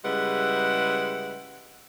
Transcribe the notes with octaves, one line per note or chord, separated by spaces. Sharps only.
C#3 G3 G#3 E4 B4 F#5